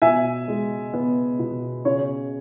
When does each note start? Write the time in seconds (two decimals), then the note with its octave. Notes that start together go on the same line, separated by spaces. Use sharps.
0.02 B2 E5 G#5
0.48 G#3
0.93 B3
1.39 B2
1.85 C#3 C#5